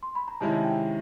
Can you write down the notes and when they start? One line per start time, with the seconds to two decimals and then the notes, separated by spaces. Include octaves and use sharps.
0.03 C6
0.15 B5
0.28 A#5
0.40 C3 D#3 G#3 C#4 E4 A5
0.65 G5